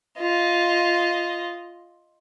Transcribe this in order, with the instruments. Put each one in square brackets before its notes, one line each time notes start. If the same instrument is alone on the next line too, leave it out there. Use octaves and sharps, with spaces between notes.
[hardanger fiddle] F4 D#5